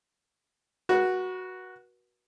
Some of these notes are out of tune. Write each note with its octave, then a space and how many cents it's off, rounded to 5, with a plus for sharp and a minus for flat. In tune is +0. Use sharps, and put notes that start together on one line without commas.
F#4 +0 B4 -40